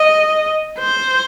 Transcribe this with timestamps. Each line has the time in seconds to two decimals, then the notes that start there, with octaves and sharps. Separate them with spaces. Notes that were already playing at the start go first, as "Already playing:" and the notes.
Already playing: D#5
0.79 C5